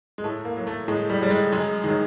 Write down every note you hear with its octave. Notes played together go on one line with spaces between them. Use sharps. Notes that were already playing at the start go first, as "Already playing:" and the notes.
G#3
A2 A3
A#3
F#3
A3
A2 G#3
G3
F#3 G3
G#3
F#2 G#3
D#3 F#3 G#3